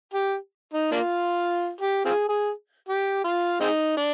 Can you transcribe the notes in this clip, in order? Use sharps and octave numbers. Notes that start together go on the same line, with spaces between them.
G4
D#4
A#3 D4 F4
G4
C4 F4 G#4
G#4
G4
F4
G#3 C4 D#4
D4